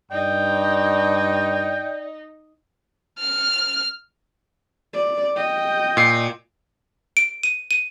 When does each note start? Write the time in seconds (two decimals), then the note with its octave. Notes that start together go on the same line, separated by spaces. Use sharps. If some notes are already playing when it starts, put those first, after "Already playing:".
0.12 G2 D#4 D5 G5
3.20 F6
4.94 D5
5.37 D#5 G5
5.97 A#2 C7
7.17 D7
7.43 D#7
7.71 D#7